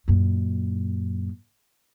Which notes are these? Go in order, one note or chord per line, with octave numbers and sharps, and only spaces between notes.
F#2 A#2